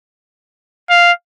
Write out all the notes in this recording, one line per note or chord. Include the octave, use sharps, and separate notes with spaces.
F5